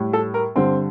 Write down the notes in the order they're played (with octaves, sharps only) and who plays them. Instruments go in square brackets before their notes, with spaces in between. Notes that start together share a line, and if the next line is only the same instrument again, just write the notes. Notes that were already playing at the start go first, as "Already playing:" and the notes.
Already playing: [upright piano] A2 G3
A4
A#4
G2 D3 G3 C4